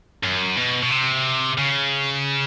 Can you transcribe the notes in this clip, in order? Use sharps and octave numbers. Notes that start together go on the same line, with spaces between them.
F#2
B2
B2
C3
C#3